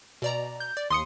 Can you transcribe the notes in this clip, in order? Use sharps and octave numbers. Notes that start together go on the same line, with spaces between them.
B2 D5 A#5
G6
D5
D#2 C6 D#6 C#7